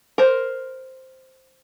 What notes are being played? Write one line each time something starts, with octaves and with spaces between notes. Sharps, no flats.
A#4 C5